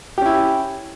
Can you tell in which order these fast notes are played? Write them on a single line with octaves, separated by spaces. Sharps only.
G4 C#4 E4